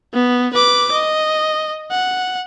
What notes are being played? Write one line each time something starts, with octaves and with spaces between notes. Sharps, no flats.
B3
B4 D6
D#5
F#5